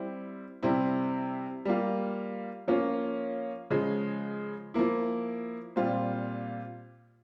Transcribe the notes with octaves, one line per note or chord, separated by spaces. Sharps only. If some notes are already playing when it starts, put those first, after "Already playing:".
Already playing: G3 C4 E4
C3 G3 C4 E4
G3 A#3 F4
F3 A#3 C#4 F4
C#3 F3 G#3
F3 A#3 E4
A#2 G3 C4 F4